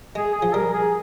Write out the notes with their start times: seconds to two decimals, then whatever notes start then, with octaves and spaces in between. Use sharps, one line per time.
0.15 G#3 G#4
0.34 G#4
0.42 F3
0.54 G3 A#4
0.74 G#4